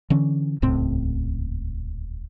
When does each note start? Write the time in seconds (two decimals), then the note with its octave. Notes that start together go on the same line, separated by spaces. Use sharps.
0.10 D3 E3 C#4
0.62 D#1 C#2 A2 C4